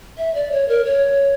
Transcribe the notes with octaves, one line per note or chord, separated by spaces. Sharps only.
E5
D5
C#5
A#4
C#5